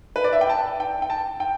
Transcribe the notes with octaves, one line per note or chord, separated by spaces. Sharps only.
B4
D5
E5
G5
A5
G5
G5
A5
G5